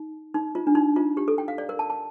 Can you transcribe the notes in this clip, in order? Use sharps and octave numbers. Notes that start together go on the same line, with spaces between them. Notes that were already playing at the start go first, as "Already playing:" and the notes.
Already playing: D#4
D#4
F4
D4
D#4
F4
G4
A4
G5
F5
D5
A#4
A5
A5